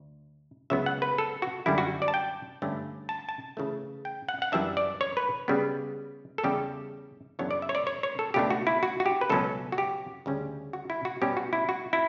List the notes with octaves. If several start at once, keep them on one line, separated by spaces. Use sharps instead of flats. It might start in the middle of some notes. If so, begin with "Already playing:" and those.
Already playing: D2
C#2 C#3 F#3 B3 E5
F#5
B4
A4
F#4
F#2 D3 G3 E4
F#4
D5
A5
G5
G2 D3 A3 C#4
A5
A5
C#3 E3 A3
G5
F#5
F#5
F#2 E3 G3 D4 E5
D5
C#5
B4
C#3 G3 B3
A4
E2 C#3 G3 G4
F#2 C#3 E3 B3 D4 C#5
D5
E5
C#5
D5
C#5
C#5
A4
C#2 B2 A3 D4 G4
F#4
E4
F#4
F#4
G4
B4
C#2 B2 F#3 C#4 A4
F#4
G4
D2 C#3 G3 C#4
F#4
E4
F#4
B2 G3 C#4 G4
F#4
E4
F#4
E4